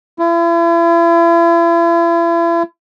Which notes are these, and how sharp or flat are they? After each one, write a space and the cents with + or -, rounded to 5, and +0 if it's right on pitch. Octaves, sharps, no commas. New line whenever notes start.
E4 +40